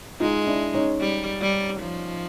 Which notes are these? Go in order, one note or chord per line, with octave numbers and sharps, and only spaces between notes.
G#3 D#4 F4
D4 E4
C#4 D#4
G3
G3
F3